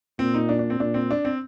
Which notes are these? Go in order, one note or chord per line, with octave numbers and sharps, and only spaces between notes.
A#2 C4
D#4
D4
D4
C4
A#2 D4
C4
D4
C4